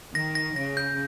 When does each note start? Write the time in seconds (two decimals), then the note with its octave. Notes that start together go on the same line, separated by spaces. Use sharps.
0.15 D#3 A#6
0.35 A#6
0.56 C#3 A#6
0.77 G6